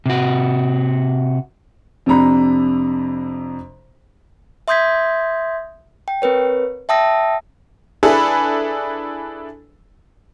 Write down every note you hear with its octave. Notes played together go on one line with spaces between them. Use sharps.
C3 F#4
F2 C3 D4 A#5 B5
E5 C6 D#6 G6 G#6 B6
G5
C4 A#4 B4 C#5
E5 G5 A5 D#6 E6 A#6
D4 E4 G#4 A4 B4